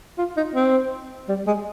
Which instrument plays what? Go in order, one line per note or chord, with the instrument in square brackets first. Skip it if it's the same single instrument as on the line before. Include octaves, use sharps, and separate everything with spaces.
[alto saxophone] F4
D#4
C4
G3
G#3